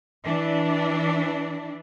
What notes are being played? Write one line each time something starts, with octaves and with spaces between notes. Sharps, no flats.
E3 D4